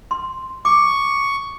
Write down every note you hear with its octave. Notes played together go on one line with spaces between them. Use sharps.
C6
C#6 D6